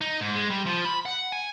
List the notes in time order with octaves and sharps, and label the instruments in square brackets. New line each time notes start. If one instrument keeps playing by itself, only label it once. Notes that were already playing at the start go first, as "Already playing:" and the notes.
[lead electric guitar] D#4
G#2
G#3
G3
F3
B5
F#5
G#5